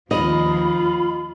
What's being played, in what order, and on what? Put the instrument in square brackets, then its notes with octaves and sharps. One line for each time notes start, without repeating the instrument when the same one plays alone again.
[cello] D#2 F3 [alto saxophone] F4 [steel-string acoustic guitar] D#5 [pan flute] B5